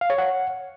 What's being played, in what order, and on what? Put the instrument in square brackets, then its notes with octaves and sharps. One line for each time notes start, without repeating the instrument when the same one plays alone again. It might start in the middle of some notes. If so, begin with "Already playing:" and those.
[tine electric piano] F5
C#5
F#5